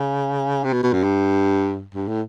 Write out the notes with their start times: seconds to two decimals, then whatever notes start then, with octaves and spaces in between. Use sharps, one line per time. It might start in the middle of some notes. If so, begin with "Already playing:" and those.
Already playing: C#3
0.64 C3
0.73 B2
0.83 B2
0.93 F#2
1.03 G2
1.95 G2
2.08 A2